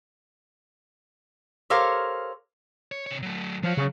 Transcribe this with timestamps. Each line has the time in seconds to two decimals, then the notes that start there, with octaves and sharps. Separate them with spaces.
1.70 G4 A4 A#4 C5 C#5 F5
2.92 C#5
3.07 C3 C#5
3.22 F#3 A3
3.64 F3 F#3 C#5
3.77 C#3